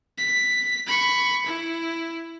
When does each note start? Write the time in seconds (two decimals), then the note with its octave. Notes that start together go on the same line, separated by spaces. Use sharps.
0.18 B6
0.87 B5 C#6
1.46 E4